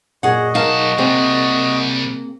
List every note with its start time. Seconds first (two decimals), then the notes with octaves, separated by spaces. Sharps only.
0.23 F#2 A#2 F#4 G#4 D#5 F#5
0.55 B1 D#4 G#4 A#4 F5 A5
0.98 C3 G3 A#3 C4 G#4